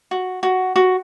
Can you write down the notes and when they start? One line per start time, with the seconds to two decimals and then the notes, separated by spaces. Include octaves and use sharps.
0.11 F#4
0.43 F#4
0.76 F#4